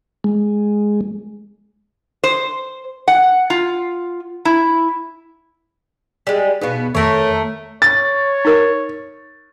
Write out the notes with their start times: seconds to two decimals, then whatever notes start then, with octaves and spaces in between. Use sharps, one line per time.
0.24 G#3
2.24 C5
3.08 F#5
3.50 F4
4.45 E4
6.27 G3 G#3
6.61 B2 B3 D#4 G#4 F5
6.95 F2 D#3 A3 A#4 C#5
7.82 C#5 A6
8.45 D#4 A#4